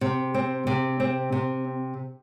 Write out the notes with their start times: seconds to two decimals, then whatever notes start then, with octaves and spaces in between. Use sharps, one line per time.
0.01 C3
0.34 C4
0.67 C3
1.00 C4
1.32 C3